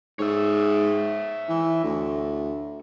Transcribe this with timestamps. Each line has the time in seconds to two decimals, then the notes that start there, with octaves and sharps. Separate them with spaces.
0.19 G#2 C#5 E5
1.49 E3
1.84 D2